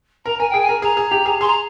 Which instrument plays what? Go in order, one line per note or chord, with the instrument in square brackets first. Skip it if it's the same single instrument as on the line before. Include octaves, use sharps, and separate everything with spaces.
[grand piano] A#4 [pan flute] A#5
[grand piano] A#4 [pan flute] G#5
[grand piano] G#4 [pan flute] G5
[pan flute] G#5
[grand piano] A#4
[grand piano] G#4 [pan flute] A#5
[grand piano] G#4
G4
G#4
[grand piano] G#4 [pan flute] C6
[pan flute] A#5